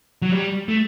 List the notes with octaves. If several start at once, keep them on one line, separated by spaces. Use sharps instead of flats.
F#3
G3
A3